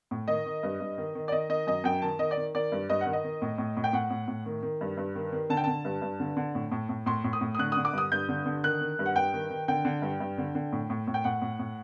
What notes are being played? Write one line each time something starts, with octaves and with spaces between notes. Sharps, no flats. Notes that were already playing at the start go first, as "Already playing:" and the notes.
A2
D#3 D#5
D#3
G2
G2
D#3
D#3
D5
D#3 D#5
D#3 D#5
F#2 D#5
F#2 G5
D#3 A5
D#3 D#5
D5
D#3
D#3 D5
G2
G2 D#5
F#5
D#3
D#5
D#3
A2
A2
A2
G5
A2 F#5
A2
A2
D#3
D#3
G2
G2
D#3
D#3
D3 A5
G5
D3 A5
G2
G2
D3
D3
A2
A2
A2
A2 C6
A2
D#6
A2
D#6
D3 F#6
D3 D#6
D6
G2 D#6
G2 G6
D3
D3
D#3 F#6
D#3
G2
F#5
G2 G5
D#3
D#3
D3 G5
D3
G2
G2
D3
D3
A2
A2
A2
G5
A2 F#5
A2
A2